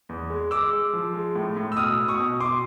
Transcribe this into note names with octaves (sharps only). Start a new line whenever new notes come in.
E2
G#3
G#3 D6 E6
G#3
F3
G#3
A2
A2
E6
B2 D#6 F6
B2
C#6 D#6
B2
B2 C6 D6